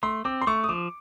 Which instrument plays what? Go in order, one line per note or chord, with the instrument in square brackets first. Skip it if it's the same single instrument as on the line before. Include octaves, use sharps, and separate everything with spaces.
[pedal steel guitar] A3 [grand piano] C6
[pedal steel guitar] C4 [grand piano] D6
[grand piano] C6
[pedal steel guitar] A3 [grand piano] C#6
[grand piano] D#6
[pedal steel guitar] F3 [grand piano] D6